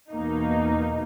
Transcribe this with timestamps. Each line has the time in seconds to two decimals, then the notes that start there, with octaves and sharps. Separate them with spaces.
0.11 E2 B2 A#3 D#4